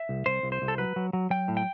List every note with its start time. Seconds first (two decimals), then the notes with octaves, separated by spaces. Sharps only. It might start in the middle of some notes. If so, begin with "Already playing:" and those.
Already playing: E5
0.09 C2
0.26 C2 C5
0.43 C2
0.52 C5
0.62 C2
0.68 A4
0.78 F#3 B4
0.96 F#3
1.13 F#3
1.30 F#3 G5
1.48 A2
1.57 G5